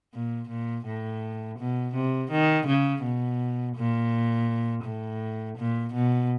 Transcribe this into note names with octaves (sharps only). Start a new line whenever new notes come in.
A#2
A#2
A2
B2
C3
D#3
C#3
B2
A#2
A2
A#2
B2